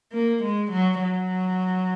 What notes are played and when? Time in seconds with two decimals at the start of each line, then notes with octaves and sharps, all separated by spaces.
0.13 A#3
0.43 G#3
0.72 F#3
1.02 F#3